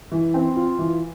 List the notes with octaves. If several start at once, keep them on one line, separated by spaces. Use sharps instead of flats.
E3
C4
F4
E3